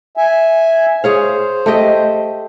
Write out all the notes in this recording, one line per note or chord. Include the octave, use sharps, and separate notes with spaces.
E5 G#5
G#4 C5 C#5 F5
A3 G4 D#5